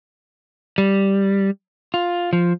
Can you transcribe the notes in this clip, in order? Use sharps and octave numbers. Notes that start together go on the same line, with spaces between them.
G3
F4
F3